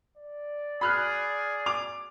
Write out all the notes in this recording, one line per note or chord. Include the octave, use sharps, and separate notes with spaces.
D5
G#4 B5 F6 F#6
D6 F7